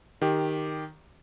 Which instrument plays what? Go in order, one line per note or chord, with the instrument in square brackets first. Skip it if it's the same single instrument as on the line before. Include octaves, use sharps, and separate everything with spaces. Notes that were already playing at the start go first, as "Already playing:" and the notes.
[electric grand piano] D#3 G4